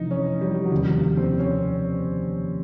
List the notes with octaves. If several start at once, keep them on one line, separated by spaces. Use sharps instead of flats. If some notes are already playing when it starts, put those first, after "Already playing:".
Already playing: F1 E3 D#4
C#4
G3
F#3
F1 D#2 C#3 G3
C4
C#4